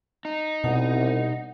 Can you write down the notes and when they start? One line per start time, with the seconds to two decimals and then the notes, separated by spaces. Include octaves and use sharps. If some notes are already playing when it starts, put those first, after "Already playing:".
0.25 D#4
0.64 C2 B2 F#5